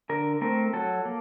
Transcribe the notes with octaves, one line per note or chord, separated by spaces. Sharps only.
D3 A#4
A3 C4 A#4
F#3 A4
A#3